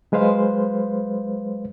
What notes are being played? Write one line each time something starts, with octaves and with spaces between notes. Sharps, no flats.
F#3 G#3 B4 C5 F5